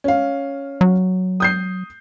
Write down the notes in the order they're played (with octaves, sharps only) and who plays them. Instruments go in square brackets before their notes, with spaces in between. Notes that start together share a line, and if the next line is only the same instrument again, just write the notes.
[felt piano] C#4 F5
[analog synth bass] F#3
[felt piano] D#6 G6 C7